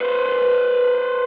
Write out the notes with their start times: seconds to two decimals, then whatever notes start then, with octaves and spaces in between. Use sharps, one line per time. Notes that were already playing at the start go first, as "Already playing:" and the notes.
0.01 B4 C5